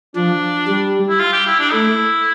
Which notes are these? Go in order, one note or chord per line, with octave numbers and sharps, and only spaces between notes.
F3 D4
G3
E4
F4
G4
E4
D4
A3 E4